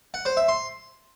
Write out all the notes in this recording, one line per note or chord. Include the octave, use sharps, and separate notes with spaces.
F#5
C5
E5
C6